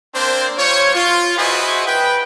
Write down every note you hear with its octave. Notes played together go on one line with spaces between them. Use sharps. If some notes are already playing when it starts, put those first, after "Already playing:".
A#3 C4 D4 C5
G3 F4 C5 C#5
F4
E4 F#4 G#4 B4 C5 D#5
B4 G5